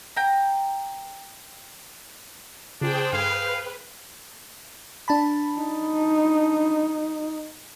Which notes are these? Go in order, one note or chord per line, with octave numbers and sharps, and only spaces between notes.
G5 A#5
C#3 D4 F4 G#4 C5 G5
G2 A4 B4 F5 G#6
D4 A5 B5
D#4